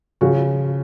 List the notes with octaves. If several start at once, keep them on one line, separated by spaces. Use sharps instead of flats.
C#3 F3 F#4